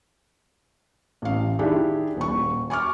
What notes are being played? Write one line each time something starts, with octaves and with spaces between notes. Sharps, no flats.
A1 F5
D#3 D4 E4 G4 G#4
D#1 C#6
G#5 C#6 D6 F6